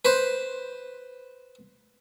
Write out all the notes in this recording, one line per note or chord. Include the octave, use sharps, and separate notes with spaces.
B4 C5